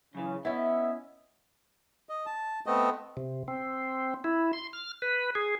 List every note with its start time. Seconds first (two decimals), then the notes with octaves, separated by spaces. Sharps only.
0.15 F#2 C#3 E3
0.45 B3 C#4 E4 D#5 E5
2.09 D#5
2.26 A5
2.66 A3 B3 C4 D#5
3.17 C3
3.48 C4
4.24 E4
4.53 C6
4.73 F6
5.02 B4
5.35 G#4